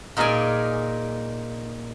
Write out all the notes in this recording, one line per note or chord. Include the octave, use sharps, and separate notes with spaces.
A#2 D#4 G#4 A#4 D5 G#5